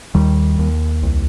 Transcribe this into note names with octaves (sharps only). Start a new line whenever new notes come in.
D#2 D#3 G3
D#2
C2